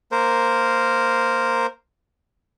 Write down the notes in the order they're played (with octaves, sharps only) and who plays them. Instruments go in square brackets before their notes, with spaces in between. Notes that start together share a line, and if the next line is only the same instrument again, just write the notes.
[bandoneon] A#3 A#4 C5